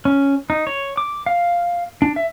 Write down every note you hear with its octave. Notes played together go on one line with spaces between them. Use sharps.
C#4
D#4
C#5
D6
F5
D4
E5